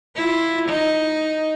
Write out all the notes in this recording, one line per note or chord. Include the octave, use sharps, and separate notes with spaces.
E4 F4
D#4